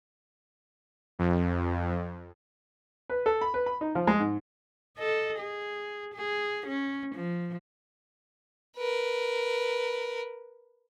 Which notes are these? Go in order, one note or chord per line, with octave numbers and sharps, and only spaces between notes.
F2
B4
A4
B5
B4
B5
D#4
F3
G#3
G#2
A4 D#5
G#4
G#4
C#4
F3
A#4 B4